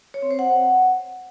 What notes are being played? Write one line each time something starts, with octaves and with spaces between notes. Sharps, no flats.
C#5
C4
C5
F#5